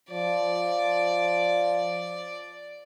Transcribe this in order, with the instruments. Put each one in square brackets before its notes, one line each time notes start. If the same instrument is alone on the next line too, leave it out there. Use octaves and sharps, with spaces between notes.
[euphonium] F3 [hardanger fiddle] D5